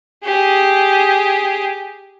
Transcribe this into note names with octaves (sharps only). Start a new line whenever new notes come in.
G4 G#4